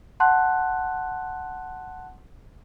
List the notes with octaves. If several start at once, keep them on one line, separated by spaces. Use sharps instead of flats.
F#5 A5 C6 F#6